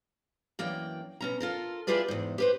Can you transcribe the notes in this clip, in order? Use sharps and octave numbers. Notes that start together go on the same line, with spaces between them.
F#2 E3 A#3 D5 G5
B2 C#4 A#5
F4 A4 A#4
E4 F4 G4 G#4 B4 D5
E2 G#2
G4 B4 C5